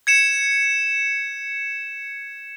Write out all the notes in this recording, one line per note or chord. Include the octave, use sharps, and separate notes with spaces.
G#6 C#7 E7